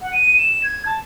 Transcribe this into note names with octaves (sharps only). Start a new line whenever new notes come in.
F#5
D#7
E7
G#6
A5